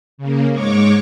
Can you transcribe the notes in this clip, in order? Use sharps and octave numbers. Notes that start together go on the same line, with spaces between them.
C#3 A#3
G#2 G#3 C#5 C#6 D6